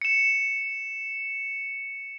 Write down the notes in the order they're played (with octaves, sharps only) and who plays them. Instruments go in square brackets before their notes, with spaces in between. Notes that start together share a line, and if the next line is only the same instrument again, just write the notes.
[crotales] C#7 E7